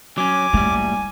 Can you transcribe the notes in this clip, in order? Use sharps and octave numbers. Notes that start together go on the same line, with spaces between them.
F#3 C#4 G#5 D6
A2 G3 A#3